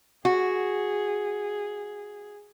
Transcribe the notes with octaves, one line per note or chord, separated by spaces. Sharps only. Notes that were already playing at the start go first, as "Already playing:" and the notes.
F#4 G#4